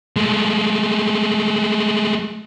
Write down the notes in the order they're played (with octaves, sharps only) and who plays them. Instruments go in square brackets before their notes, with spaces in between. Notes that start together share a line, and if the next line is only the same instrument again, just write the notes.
[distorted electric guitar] G#3 A3